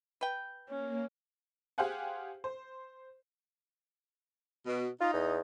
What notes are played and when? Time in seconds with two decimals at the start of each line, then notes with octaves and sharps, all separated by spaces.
0.21 B4 G5
0.68 A#3 C#4
1.78 G4 G#4 C5 F5 F#5 G#5
2.44 C5
4.66 B2
5.01 D#4 F4
5.14 E2